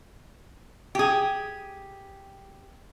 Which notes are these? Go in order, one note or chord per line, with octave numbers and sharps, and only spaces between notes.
G4 G#4